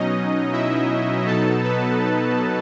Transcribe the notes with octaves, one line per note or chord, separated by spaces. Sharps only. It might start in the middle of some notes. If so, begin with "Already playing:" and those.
Already playing: B2 F#3 C#4 D#4 D#5
E4 E5
B2 F#3 B3 D#4 A4 A5
B3 B4
A4